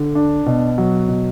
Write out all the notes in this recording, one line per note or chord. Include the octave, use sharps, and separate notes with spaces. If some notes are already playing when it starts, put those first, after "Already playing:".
Already playing: D3
D4
B2
F#3
B2